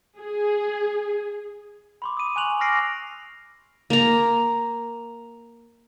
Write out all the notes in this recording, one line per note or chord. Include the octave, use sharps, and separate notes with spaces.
G#4
B5 C6 D6
D#6 D#7
G#5 C#6 F#6 F7 F#7
D6 E6 F6 A#6 C7 D7
A#3 A#5